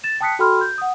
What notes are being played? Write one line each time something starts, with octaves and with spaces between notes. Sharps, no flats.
A6 E7
G5 A5 D#6 F#6 B6 C#7
F#4 A4 G5 B5 C6 F6
G6
F#5 D#6